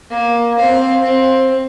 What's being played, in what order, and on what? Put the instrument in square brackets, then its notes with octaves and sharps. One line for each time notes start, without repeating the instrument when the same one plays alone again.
[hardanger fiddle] A#3
C4 F5
C4